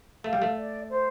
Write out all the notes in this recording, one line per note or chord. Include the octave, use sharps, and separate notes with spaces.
A3 F5
G3
A3
D5
C5